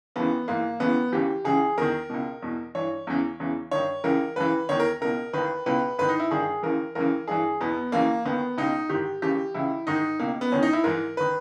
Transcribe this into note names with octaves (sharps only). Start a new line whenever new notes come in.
D#2 C#3 E3 B3
G#2 E3 A#3
D#2 C#3 E3 B3
D#2 C#3 E3 G4
C#2 C#3 E3 G#4
E2 D#3 A#4
C#2 B2
E2 B2
G2 E3 C#5
E2 C#3 E3
E2 C#3 E3
G2 D#3 C#5
C#2 C#3 E3 A#4
D#2 C#3 E3 B4
E2 D#3 C#5
A#4
C#2 B2 A#4
D#2 D#3 B4
C#2 B2 B4
G#2 D#3 B4
D#4
E4
G2 D#3 G#4
D#2 C#3 E3 A#4
D#2 C#3 E3 A#4
G2 E3 G#4
E2 B2 B3
D#2 C#3 E3 A#3
D#2 D#3 B3
C#2 B2 D#4
G#2 D#3 G4
D#2 C#3 E3 G4
C#2 C#3 E3 E4
G#2 D#3 D#4
C#2 B2 A#3
B3
E2 D#3 C#4
D#4
E4
G#2 E3 A#4
D#3 B4